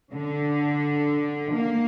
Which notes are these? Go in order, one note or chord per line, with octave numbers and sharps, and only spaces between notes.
D3
A#3